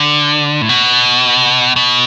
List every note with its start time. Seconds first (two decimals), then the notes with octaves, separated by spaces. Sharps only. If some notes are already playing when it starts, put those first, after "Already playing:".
Already playing: D3
0.62 A2
0.69 B2
1.76 B2